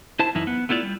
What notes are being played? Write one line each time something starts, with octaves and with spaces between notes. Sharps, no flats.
E4 C5 A5
F#2 E3 D#4 E4
B3
A3 B3 E4 F4 D5
G3